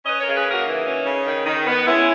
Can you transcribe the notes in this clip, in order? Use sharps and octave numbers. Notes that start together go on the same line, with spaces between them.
C#4 B4 D#5
A#4 C#5
C#3
G#4 B4
A#3
F#4 A#4
E3 D#4
C#4
C#3
D#3
D#3
B3
G#3 C#4 E4